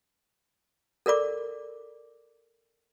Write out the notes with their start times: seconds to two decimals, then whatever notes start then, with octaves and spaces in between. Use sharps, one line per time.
1.06 A4 A#4 D5 D6